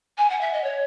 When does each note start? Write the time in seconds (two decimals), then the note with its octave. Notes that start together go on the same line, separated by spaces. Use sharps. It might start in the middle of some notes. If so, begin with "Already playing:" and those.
0.17 G#5
0.29 F#5
0.40 E5
0.52 D#5
0.63 C#5